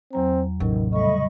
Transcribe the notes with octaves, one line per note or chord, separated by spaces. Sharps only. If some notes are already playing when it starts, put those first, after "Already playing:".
E2 F#3 C4 A#5
A1 A2 C3 D#3 F#3
C#3 G3 A3 D#5 B5 C#6